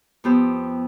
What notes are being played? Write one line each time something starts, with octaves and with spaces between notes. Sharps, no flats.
F2 B3 G4 C5